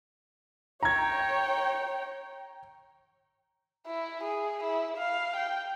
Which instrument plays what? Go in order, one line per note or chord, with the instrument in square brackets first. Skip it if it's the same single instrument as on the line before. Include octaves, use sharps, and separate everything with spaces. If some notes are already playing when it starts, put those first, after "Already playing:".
[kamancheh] C#5 G5 [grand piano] A#5 G#6
[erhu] E4
G#4
E4
F5
G5